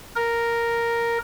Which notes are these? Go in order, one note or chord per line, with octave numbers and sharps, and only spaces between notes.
A#4